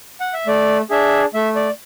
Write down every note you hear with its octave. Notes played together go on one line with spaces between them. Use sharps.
F#5
E5
A3 D5
D4 G#4 E5
A3 E5
D5